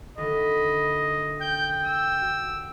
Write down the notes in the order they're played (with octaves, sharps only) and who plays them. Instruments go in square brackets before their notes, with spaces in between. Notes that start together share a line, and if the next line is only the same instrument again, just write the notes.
[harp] D2 D#3 [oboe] D#5 [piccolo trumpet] B5
[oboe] G5 [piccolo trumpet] G6
[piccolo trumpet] E6
[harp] F#4